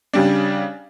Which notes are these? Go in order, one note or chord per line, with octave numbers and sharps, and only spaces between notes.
C#3 G3 D4